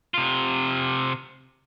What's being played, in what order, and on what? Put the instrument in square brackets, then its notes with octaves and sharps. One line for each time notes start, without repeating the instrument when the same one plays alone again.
[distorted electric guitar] C3 F4